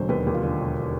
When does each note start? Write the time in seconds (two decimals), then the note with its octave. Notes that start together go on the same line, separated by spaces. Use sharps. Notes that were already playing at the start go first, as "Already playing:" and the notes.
Already playing: E1 D3 F#3 C5
0.09 D#2 B4
0.27 D#2
0.34 F4
0.43 D3
0.60 E1